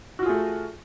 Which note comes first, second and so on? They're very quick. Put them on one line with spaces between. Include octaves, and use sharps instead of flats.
F#4 F4 G#4 A3